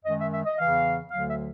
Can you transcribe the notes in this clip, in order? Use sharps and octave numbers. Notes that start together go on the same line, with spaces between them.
F#2 D#3 G#3 D#5
E5
E5
D#5
E2 C#3 E3 F5
D2 D3 F#3 F5
E5